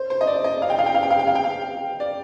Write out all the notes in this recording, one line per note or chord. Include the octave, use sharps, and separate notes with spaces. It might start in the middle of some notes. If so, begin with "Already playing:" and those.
Already playing: C5
C5
D#5
D5
D#5
F5
G5
F5
G5
F5
G5
F5
G5
F5
G5
F5
D5